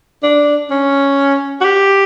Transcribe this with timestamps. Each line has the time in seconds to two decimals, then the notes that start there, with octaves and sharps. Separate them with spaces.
0.23 D4
0.71 C#4
1.61 F#4
1.65 G4